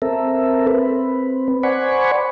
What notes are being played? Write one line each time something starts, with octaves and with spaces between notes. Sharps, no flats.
C4 A4 A#4 E5
C4 B4
C5 D5 F#5 G#5 B5 C#6